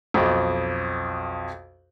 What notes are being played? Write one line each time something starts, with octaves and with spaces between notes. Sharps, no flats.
B1 F2